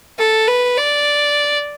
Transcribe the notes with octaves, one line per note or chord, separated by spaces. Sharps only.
A4
B4
D5